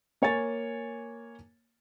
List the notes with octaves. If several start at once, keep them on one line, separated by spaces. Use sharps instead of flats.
A#3 C#5 G#5 A6